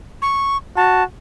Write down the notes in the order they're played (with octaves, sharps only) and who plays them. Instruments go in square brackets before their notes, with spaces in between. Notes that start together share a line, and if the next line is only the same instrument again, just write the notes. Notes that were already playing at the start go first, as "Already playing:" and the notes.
[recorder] C#6
[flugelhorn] F#4 [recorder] A5